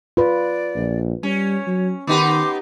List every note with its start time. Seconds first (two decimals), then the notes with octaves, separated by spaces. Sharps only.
0.17 F4 B4 D5
0.75 A#1
1.23 G3 C#4 C#5
1.67 F#3
2.07 D#3 B3 D#4 G4 C6 D6